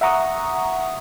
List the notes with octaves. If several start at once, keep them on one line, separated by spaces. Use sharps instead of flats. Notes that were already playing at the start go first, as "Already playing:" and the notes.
E5 F#5 A#5 C#6 D#6